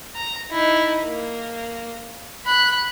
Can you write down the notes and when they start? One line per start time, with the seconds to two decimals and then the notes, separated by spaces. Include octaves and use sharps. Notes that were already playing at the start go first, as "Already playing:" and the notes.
0.16 A#5
0.51 D#4 E4
1.05 A#3
2.46 B5 F#6